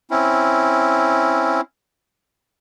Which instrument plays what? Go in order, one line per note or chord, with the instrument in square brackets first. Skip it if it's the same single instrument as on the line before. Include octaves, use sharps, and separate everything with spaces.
[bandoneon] C4 C#4 E4